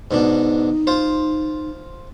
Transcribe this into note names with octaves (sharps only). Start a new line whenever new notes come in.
G#2 B2 D4 D#4
F4 C5